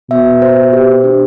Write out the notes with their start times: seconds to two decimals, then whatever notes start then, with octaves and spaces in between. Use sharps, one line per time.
0.10 B2 E5
0.42 C5
0.73 G4
1.04 D4